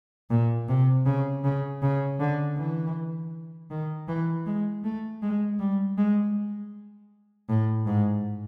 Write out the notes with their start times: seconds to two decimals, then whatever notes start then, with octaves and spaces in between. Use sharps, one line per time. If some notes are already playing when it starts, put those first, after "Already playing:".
0.30 A#2
0.68 C3
1.05 C#3
1.44 C#3
1.82 C#3
2.20 D3
2.57 E3
3.70 D#3
4.08 E3
4.46 G#3
4.84 A3
5.22 G#3
5.59 G3
5.97 G#3
7.49 A2
7.86 G#2